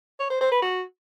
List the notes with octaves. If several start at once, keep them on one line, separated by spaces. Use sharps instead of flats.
C#5
C5
C5
B4
F#4